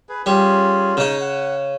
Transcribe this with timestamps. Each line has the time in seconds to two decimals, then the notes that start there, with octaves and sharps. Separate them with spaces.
0.09 G#4 B4
0.26 G3 C#4 F4 G#4
0.97 C#3 D#4 C#5
1.21 F#5